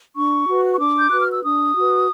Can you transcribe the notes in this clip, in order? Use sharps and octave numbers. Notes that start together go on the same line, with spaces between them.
D4 C#6
F#4 B4
C#6
D4 D6
G6
F#4 B4 F#6
F6
E6
D4 D#6
F#4 B4